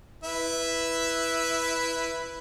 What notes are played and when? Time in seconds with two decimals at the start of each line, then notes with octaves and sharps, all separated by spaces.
0.24 E4 B4 E5